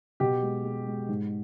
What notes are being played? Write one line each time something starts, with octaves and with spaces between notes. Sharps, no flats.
B2 G4
G#3
G#3
G#3
G#2